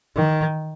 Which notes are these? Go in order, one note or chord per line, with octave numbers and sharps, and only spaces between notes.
D#3